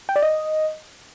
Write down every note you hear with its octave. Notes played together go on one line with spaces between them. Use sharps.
G5
D5
D#5